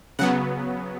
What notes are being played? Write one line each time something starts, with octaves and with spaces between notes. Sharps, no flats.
C#3 F#3 B3 F#5